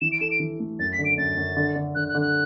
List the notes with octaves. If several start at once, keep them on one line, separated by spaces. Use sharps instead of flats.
E3 E7
D7
A4 E7
D7
E3
A3
F#2 A6
B6
D3
D7
F#2 A6
F#2
D3
D3
D3 F#6
F#6
D3
F#6